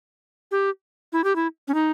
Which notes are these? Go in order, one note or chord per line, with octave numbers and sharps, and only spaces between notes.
G4
E4
G4
E4
C#4
D#4